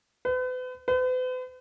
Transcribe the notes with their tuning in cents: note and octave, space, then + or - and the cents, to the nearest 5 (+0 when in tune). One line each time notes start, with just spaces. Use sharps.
B4 +40
B4 +45